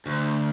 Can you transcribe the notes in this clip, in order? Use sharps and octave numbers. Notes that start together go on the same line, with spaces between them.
D2